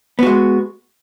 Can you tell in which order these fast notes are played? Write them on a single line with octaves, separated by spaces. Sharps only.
B3 F#4 G#3